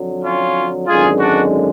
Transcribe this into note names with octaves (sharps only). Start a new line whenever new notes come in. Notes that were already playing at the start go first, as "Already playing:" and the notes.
Already playing: F2 D3 F#3
C#4 F4
G#1 F#2 D3 G#3 F4 G#4
D4 F#4